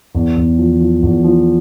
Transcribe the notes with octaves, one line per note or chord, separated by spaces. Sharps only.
E2
E2
F3
F3
E2
F3